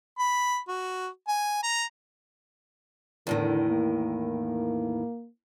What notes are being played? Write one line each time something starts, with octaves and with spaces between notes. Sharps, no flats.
B5
F#4
G#5
A#5
E2 A2 D3 D#3
A#3